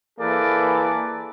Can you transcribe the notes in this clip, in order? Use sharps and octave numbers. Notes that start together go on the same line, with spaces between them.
E3 A#3 G#4 A4 B4 D5